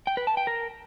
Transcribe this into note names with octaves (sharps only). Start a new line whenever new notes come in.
G5
B4
A5
G5
A#4